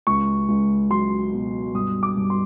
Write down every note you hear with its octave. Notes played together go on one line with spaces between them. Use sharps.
C#2 C#6
C#2
F#3 C6
B2
G2 D#6
D6
G2
C6